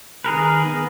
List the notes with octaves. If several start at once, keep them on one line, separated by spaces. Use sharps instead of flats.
D#3 G#4 A#4 B4
B3